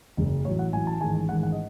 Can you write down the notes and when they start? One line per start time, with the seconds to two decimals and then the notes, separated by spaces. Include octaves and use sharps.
0.17 F#1 F#2 C#3
0.45 A1 A2 F#3 C#5
0.59 F#5
0.73 A1 A2 F#3 G#5
0.87 A5
1.01 A1 G#2 D#3 G#5
1.29 A1 G#2 D#3 F#5
1.43 F#5
1.52 D#5